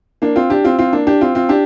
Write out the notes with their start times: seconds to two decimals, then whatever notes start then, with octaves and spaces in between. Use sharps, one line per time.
0.22 A#3 D4
0.36 C4 F4
0.50 D4 G4
0.64 C4 F4
0.79 C4 F4
0.93 A#3 D4
1.07 D4 G4
1.21 C4 F4
1.35 C4 F4
1.49 D4 G4